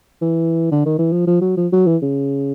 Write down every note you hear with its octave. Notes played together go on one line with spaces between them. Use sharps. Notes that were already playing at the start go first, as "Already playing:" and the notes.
E3
D3
D#3
E3
F3
F3
F#3
F3
F#3
E3
C#3